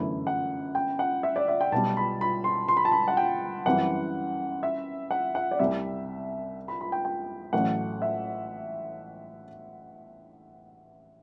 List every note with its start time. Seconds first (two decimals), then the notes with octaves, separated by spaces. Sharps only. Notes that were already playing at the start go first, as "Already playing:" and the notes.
Already playing: G1 F#2 E3 A3 E4
0.27 F#5
0.75 G5
0.99 F#5
1.23 E5
1.36 D5
1.48 E5
1.61 G5
1.72 B1 B2 G3 A5
1.97 B5
2.21 B5
2.44 C6
2.68 C6
2.77 B5
2.85 A5
2.92 B5
3.08 F#5
3.17 G5
3.66 F#2 E3 G3 C4 E4 F#5
4.63 E5
5.11 F#5
5.35 F#5
5.51 D5
5.59 C2 C3 G3 E5
6.68 B5
6.81 B5
6.92 G5
7.05 G5
7.53 A1 A2 F#3 A3 F#5
8.02 E5